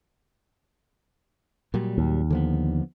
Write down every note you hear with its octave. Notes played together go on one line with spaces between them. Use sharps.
A#2 F#3 G3
D#2
D3 F3 B3